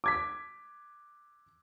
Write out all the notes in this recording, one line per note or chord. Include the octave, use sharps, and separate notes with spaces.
D6 G#6 B6